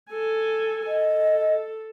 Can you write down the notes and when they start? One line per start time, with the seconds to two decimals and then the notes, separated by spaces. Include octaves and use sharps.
0.12 A4 G#5
0.87 A4 D#5